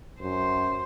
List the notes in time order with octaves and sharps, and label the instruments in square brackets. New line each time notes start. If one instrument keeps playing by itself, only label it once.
[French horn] F#2 [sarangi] C5